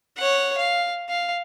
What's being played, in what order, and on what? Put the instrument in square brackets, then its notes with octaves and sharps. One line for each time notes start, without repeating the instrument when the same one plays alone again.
[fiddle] C#5 F#5
F5
F5